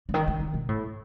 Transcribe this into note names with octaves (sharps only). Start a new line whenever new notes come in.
C#3
D#3
D#3
D#3
B2
A2